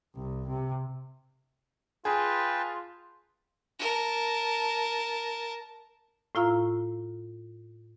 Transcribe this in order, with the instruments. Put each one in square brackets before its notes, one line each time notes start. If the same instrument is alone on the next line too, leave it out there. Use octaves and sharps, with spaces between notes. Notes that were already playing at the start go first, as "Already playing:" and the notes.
[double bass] C2
C3
[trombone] F4 [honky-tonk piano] G#4 [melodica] B4 G5 A5
[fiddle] A#4 A5
[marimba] A2 E4 F4 F5 A#5 E6